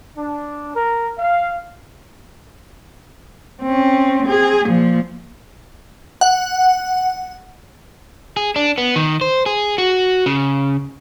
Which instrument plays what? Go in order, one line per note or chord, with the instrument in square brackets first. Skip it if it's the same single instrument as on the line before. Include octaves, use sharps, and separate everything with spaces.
[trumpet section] D4
A#4
F5
[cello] C4 C#4
C4 G#4
A#2 F3
[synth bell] F#5
[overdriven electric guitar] G#4
D4
B3
D#3
C5
G#4
F#4
C#3